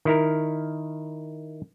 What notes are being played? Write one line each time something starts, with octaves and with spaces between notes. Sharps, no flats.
D#3 E4 A#4